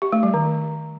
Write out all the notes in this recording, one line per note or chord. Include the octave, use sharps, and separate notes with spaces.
G4
A3
G3
D#3